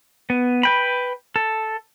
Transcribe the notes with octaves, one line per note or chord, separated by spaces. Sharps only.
B3
B4 G5 B5
A4